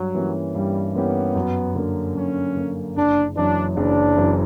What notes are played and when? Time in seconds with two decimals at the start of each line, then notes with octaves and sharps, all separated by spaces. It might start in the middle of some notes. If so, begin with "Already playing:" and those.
Already playing: G2 F#3
0.15 E3 A#3 C#4 G4
0.55 G2 G3
0.95 E3 A#3 B3 C#4 G4
1.36 F#2
1.75 D3 A#3
2.15 F#2 C#4
2.56 D3 A#3
2.97 F#1 D4
3.36 F#2 E3 D4
3.77 F#1 D4
4.17 F#2 E3